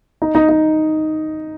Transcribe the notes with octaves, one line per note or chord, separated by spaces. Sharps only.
D#4
D#4
D#4